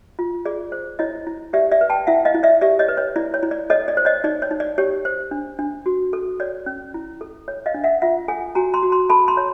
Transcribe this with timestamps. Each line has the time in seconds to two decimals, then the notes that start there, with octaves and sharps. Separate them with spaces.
0.19 F4
0.45 G#4 D5
0.72 C5
0.99 E4 C#5 D#5
1.27 E4
1.53 G4 D5 E5
1.71 D5 E5
1.81 B4
1.90 G5 A5
2.07 E4 E5 F#5
2.25 D#5 F5
2.34 E4
2.43 D5 E5
2.61 G4 D5 E5
2.79 C#5 D#5
2.88 B4
2.97 C#5
3.16 E4 D5
3.34 C#5
3.43 E4
3.51 D5
3.70 A4 C#5 D#5
3.88 D5
3.97 C5
4.05 C#5 D#5
4.24 D#4 D5
4.42 C#5
4.51 D#4
4.60 D5
4.78 G4 C#5
5.05 C5
5.31 D4
5.59 D4
5.86 F#4
6.13 A4
6.40 C#5 D5
6.66 C#4
6.94 E4
7.21 A4
7.48 C#5
7.66 D#5 F5
7.74 D4
7.84 E5 F#5
8.02 F4 E5 F#5
8.28 A4 F#5 G#5
8.55 F#4 G#5 A#5
8.74 A#5 C6
8.83 F#4
8.92 A#5 C6
9.09 A4 A5 B5
9.28 A#5 C6
9.37 C#5